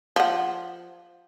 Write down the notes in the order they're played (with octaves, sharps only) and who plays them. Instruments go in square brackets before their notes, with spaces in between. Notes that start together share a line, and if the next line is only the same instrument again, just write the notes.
[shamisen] F3 F#5